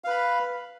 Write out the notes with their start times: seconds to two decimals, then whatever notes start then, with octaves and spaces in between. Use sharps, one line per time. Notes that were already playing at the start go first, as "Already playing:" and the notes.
0.04 F5
0.07 B4
0.10 B5